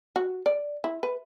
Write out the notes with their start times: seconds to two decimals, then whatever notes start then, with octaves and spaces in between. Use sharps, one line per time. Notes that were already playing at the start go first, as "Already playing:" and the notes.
0.16 F#4
0.46 D5
0.84 E4
1.03 B4